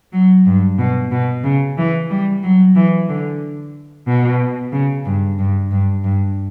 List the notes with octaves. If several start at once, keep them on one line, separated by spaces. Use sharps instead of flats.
F#3
G2
B2
B2
C#3
E3
G3
F#3
E3
D3
B2
C#3
G2
G2
G2
G2